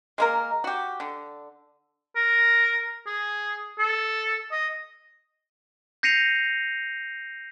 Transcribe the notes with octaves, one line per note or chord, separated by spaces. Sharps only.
G#3 A#3 A#4
F#4 G4
D3
A#4
G#4
A4
D#5
G6 A#6 C7 C#7 D#7 F7